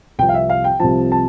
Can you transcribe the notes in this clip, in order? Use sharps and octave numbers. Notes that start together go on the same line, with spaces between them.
C2 C3 F3 G5
F5
E5
F5
G5
C2 C3 F3 A5
A5